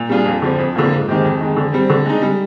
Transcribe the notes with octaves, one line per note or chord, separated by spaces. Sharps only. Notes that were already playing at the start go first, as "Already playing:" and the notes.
Already playing: A#2
G3 D4 F4 G#4
F2
D3 F3 C4
F2
D3 F3 A#3 F4
G#2
D#3 G#3 C4 G4
F2
D#3 G#3
D3
G3 C4
D3
G#3 D#4
G3